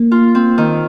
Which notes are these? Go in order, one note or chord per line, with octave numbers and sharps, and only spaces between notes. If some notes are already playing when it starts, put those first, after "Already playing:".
Already playing: A#3
F4
C4
D#3